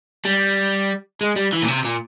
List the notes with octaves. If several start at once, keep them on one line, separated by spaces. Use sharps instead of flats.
G3
G#3
G3
E3
A#2
C3
A#2